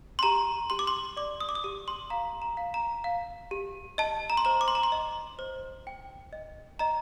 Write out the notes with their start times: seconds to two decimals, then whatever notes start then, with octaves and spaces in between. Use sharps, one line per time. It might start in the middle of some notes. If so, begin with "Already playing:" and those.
0.19 C6
0.23 G4 A#5
0.70 G4 C6
0.79 D6
0.87 C6
1.17 D5 D6
1.40 D#6
1.49 D6
1.55 D#6
1.64 G4 D6
1.88 C6
2.10 F5 A#5
2.42 A#5
2.57 F5
2.74 A#5
3.04 F5
3.51 G4
3.98 D#5 A5
4.30 A#5
4.37 C6
4.45 C5 A#5
4.61 D6
4.68 C6
4.75 A#5
4.83 C6
4.92 D#5
5.39 C5
5.87 G5
6.33 D#5
6.79 D#5 A#5